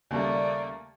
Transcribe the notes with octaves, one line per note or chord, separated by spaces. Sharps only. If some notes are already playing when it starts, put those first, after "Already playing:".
D#2 C#3 G3 A3 A#3 D5